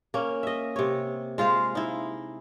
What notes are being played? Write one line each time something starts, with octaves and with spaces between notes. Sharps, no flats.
A#3 C#4
D#5 E5
C3 C#5
G#3 F4 C5 F5
D#4 E4